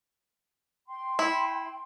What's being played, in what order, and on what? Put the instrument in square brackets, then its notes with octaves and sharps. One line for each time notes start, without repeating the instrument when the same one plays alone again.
[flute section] G5 C6
[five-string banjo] E4